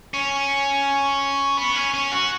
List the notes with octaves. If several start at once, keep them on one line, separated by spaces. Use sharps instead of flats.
C#4
B3
C#4
C#4
F#4